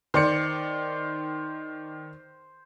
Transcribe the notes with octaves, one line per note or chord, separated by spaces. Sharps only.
D#3 C5 D5 C#7